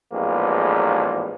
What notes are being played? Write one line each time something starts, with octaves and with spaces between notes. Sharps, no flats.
A1 E2 G#2 F3 A#3